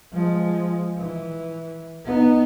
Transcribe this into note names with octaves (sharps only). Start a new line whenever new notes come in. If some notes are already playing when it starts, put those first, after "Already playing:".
F3 G#3
E3
B3 D#4